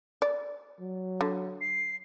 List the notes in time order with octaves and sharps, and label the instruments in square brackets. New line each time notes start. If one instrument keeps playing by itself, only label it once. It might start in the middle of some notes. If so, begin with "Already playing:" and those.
[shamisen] D5
[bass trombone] F#3
[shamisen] D3
[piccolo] C7